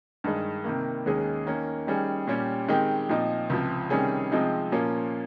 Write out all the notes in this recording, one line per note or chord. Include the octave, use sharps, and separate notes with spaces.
G2 D#3 G#3
C3 D#3 A#3
D#2 D#3 G#3 C#4 G#4
D#3 A#3 C#4
D#3 G3 C#4 G#4
A#2 G3 C#4 G4
D#3 G#3 C4 G4
A#2 F3 C4 D#4
C#2 C3 F3
C3 D#3 G3 C#4 G#4
C3 F3 G#3 C4 D#4
A#2 F3 A#3 C#4